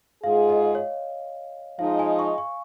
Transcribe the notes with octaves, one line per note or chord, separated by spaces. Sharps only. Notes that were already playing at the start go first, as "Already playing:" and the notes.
G#2 G#3 F4 G#4 F5
D#5
C#5
F3 G#3 D#4 F5
G#5
C#6
C#6